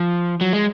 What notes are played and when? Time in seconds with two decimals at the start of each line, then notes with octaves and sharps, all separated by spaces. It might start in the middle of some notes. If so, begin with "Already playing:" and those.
Already playing: F3
0.41 F#3
0.53 G#3